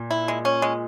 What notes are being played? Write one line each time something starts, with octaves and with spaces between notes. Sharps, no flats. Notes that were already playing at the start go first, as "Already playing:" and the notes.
Already playing: A#2
E4
G#3
C#4
G#3